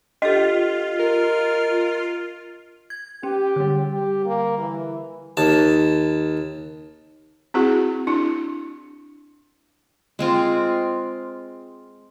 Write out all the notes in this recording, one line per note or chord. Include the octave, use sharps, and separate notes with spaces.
D4 F4 G4 A4 D#5
A#4
G#6
C#4 G4
D3 G3
G4
A#3
E3
D#2 A5
C4 E4 F#4 G#4 F#5
D4 E4
G#3 C4 F4